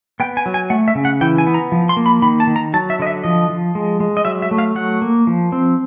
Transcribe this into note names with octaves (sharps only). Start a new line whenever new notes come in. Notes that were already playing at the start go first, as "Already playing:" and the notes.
B3 G5
G#5
F#3
G#5
A3 F#5
E5
C#3
F#5
E3 G5
G#5
B3
A#5
F3
C6
A#3
B5
D#3 B5
A5
D#3
A#5
F#3 A5
E5
D3 D#5
E5
F3 D#5
F3
G#3
G#3
D#5
F#3 E5
E5
A3
F5
F#3 F#5
A#3
F3
C4